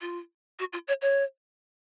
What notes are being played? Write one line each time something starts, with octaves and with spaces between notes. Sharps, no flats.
F4
F#4
F4
C#5
C#5